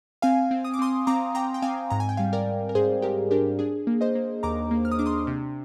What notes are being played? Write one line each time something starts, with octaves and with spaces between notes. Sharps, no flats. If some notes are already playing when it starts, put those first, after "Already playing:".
C4 F5 G#5
C4
D#6
D6
C4 C6 D#6
C4 A#5 D6
C4 G5 A#5
G5
C4 F5 G#5
G#2 A#5
G#5
G5
G3 F5 G#5
A#4 D5
G#2
A#4
G#2 G#4 C5
G#2 G4 A#4
D4 G4 A#4
D4 G#4
A#3
C5 D#5
A#3
D#2 A#5 D6
A#3
F6
D#6
D4 D6
C6 D#6
C3